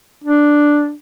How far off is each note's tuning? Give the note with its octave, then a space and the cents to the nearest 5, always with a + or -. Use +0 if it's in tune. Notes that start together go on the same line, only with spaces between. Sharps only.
D4 +0